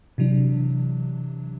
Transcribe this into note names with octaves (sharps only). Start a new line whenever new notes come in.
C3 E3 F#3 D4